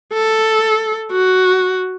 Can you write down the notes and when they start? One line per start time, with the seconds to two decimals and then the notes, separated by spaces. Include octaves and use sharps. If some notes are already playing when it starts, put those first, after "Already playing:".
0.13 A4
1.11 F#4